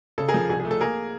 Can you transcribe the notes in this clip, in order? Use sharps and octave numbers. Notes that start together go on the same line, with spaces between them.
C#3 A4
G#4 A#4
F3
C2 G#4
G#4
A3
A4
A#3 G#4 A#4